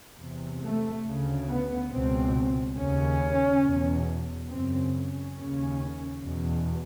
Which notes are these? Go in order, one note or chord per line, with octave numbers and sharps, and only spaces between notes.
E2 C3
A3
D2 C#3
B3
C#2 B2 C4
D#2 C#3 C#4
E2 B2
F#2 C#3 C4
C#4
D#2 C#3
E2 B2